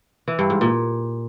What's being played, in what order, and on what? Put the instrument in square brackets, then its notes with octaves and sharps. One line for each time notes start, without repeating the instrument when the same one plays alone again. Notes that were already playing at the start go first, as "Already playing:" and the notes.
[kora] E3
G2
G#2
A#2